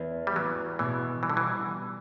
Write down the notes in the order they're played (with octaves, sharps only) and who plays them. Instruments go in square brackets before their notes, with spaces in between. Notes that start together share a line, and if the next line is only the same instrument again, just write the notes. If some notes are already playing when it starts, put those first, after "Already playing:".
Already playing: [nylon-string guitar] E2
[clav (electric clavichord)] G3
[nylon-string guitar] E2 [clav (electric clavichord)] F#3
[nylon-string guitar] B2 [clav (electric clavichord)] E3
[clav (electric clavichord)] E3 [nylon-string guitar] G3
[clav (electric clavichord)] D3
E3